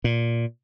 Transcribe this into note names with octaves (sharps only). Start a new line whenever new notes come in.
A#2